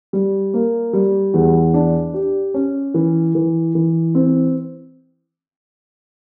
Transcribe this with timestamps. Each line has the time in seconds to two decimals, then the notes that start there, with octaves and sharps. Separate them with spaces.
0.13 G3
0.54 A#3
0.93 G3
1.34 E2
1.74 D4
2.14 G4
2.54 C#4
2.94 E3
3.35 E3
3.75 E3
4.15 C4